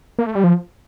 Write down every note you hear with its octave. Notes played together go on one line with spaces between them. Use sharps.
A#3
A3
G3
F3